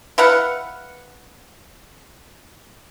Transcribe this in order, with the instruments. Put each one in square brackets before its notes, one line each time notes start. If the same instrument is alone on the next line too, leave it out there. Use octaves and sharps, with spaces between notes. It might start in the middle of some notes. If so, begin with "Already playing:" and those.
[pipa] E4 B4 F5 F#5